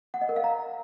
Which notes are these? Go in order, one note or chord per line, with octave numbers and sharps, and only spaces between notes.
F#5
D#5
A#4
F5
A#5